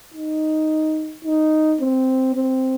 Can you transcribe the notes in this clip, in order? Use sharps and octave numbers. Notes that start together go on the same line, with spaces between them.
D#4
D#4
C4
C4